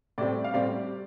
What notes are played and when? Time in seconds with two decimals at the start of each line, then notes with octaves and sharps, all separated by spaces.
0.18 A2 G3 C4 D5
0.44 F5
0.54 A2 G3 C4 D5